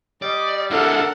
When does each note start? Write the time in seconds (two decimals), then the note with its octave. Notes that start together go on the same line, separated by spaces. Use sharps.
0.22 G3 D5 D#5
0.71 D4 E4 A4 A#4 F#5